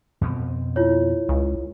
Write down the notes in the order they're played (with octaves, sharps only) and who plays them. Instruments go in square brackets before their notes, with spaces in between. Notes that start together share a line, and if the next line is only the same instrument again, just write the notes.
[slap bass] F2 B2 C4
[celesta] E4 F4 C#5
[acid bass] C#2